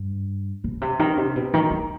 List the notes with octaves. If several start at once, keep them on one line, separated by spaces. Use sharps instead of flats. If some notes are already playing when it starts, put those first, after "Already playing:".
Already playing: G2
B2
C3
D#3
C3
B2
D#3
E2